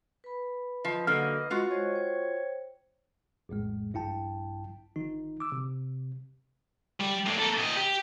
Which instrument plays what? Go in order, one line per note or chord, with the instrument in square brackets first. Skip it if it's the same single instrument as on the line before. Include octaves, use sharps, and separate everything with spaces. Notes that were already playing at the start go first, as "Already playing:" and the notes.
[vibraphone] B4 B5
[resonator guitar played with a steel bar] F3 [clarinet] D#5
[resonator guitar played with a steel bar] D3 F#3 A#3 [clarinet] D#5 [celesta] F6
[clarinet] G#3 [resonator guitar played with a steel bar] F4 F#4
[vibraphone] G#3 C5 D#5 [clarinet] C#5
[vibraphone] C5 G5
[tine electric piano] A#1 F2 A2 G#3
A#1 G2 E4 G5 A5
G1 D#3 D#4
D6 E6
C3
[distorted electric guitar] G3
A2 D5
A#3 A4
A#2 D#5
G4